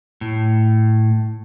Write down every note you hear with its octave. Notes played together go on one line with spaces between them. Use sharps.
A2